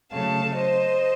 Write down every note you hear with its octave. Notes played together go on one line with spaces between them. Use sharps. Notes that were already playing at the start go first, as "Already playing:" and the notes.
C#3 F#3 A3 F5 A5
C5 D#5